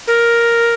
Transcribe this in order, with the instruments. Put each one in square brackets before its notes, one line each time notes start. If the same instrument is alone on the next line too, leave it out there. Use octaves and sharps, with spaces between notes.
[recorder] A#4